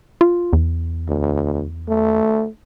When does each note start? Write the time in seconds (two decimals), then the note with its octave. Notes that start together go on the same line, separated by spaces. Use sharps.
0.21 F4
0.53 E2
1.08 D2
1.89 A3